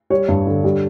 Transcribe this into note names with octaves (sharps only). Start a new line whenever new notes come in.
G3 C#5
G2
D3
G3